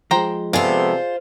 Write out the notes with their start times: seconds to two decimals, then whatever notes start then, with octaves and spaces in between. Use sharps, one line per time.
0.11 F3 G#3 C5 G5 A#5
0.53 C3 B3 F4 G#4 A4 C5 D5